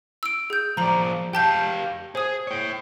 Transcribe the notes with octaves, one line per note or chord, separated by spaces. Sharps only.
E6 D7
G#4 G6
F3 D5 A#5 F#7
G4 F5 G5 A5 G6
G#4 C5 D#6
C#5 G5